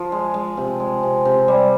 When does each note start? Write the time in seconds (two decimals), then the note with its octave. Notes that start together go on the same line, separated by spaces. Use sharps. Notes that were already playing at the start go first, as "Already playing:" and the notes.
Already playing: F3
0.12 G#3
0.34 G#3
0.57 C3
0.80 G#3
1.03 C3
1.25 C3
1.48 G3